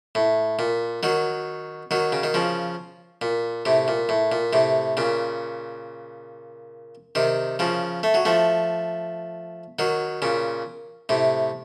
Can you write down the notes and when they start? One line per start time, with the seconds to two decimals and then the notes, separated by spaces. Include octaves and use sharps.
0.15 A2
0.59 A#2
1.03 D#3 F#3
1.91 D#3 F#3
2.12 C#3
2.23 D#3
2.34 C#3 F3
3.22 A#2
3.65 A2 C3
3.88 A#2
4.09 A2
4.32 A#2
4.53 A2 C3
4.97 A#2 C#3
7.15 C3 D#3
7.59 C#3 F3
8.03 A3
8.14 F#3
8.25 F3 A3
9.79 D#3 F#3
10.22 A#2 C#3
11.09 A2 C3